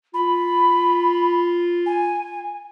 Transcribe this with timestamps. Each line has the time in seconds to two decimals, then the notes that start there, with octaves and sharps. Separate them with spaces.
0.14 F4 B5
1.86 G#5